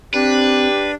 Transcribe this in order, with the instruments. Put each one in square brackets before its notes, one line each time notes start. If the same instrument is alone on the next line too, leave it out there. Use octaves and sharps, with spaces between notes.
[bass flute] C4 [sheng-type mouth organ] D4 [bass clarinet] G4 [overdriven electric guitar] B4